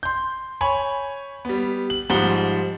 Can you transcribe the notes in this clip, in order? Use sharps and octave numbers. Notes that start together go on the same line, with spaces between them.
C6 G6
C#5 G#5 B5 C#6
G3 B3
F#7
G#2 F3 G3 F#5 G7